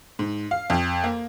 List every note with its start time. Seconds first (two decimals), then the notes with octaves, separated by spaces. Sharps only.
0.19 G#2
0.51 F5
0.70 F2
1.04 A#3